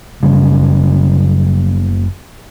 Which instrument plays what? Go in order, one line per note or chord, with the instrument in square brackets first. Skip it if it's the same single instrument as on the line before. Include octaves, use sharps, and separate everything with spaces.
[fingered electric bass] F#1 C#3 G3 C#4